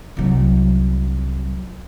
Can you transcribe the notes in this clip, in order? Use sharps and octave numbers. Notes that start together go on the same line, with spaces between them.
C2 F#3